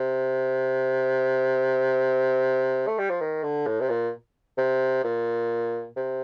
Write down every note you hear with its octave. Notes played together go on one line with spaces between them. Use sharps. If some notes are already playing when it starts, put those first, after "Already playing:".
Already playing: C3
A3
G3
F3
D#3
D3
A2
C3
A#2
C3
A#2
C3